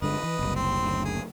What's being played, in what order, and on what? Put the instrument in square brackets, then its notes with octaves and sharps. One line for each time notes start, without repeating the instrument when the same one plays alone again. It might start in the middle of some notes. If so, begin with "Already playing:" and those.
[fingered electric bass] G1 D3 G#3 [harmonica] B4 D#5
[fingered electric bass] E3
F#1 C2
[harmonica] C4 C6
[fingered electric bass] F#1 D2
[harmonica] G#4